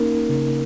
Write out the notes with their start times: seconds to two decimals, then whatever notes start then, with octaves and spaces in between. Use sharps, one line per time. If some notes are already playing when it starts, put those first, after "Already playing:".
Already playing: A#3 C#4 D#4 A#4
0.29 C#3